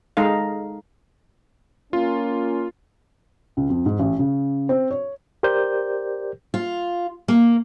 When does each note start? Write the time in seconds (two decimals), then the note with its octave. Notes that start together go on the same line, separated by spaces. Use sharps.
0.17 G#3 D#4 A4 F5
1.93 A#3 C#4 F4
3.57 C#2
3.70 F2
3.86 G#2
3.99 A1
4.19 C#3
4.69 C4
4.91 C#5
5.43 G4 A#4 C5 D5 G6
6.54 F4
7.28 A#3